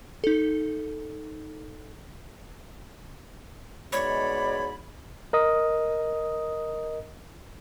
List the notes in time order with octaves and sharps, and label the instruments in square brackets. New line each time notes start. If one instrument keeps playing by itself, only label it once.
[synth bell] D#4 A4
[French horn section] G#2 B2 G#3 [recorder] C#5 [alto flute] D5 [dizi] B5
[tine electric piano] A#4 D#5 D#6